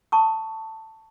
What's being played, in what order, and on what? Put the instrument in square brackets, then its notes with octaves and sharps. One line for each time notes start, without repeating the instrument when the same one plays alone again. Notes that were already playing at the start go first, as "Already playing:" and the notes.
[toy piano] A5 C#6 D#6